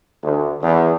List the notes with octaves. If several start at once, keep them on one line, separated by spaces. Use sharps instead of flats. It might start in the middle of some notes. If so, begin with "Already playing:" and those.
D2
E2